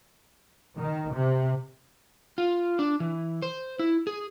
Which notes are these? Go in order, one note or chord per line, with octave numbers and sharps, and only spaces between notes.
D#3
C3
F4
D4
E3
C5
E4
G#4